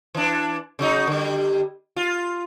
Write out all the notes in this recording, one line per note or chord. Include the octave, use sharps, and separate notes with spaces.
E3 D4
C#3 F#3 D#4
D3 G3
F4